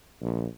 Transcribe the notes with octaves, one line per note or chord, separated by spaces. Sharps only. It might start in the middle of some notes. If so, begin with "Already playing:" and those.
A#1